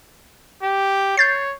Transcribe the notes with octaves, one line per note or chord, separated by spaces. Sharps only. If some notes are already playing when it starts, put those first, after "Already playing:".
G4
C#5 G6 A6 C7